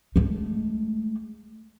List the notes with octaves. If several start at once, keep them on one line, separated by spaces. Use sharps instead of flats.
G#3 A3